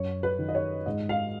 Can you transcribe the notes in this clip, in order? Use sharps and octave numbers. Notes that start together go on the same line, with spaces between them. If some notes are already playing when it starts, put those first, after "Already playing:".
Already playing: F#2 C#5
B4
D#3
D#5
C#5
G#2 D#5
F5